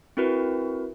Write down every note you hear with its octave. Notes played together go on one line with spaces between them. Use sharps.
C4 E4 F#4 A#4 B4